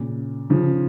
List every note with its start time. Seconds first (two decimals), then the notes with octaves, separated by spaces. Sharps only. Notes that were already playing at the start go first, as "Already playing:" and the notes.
Already playing: A#2 C#3
0.50 C#3 F3